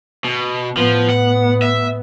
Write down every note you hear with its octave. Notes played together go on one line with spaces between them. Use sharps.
B2
A2 F3 B3
F#5
E5